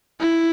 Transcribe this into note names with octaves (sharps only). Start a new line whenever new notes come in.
E4